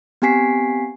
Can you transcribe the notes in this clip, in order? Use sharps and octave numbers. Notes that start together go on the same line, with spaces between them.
B3 C4 G4 G#5 B6 C7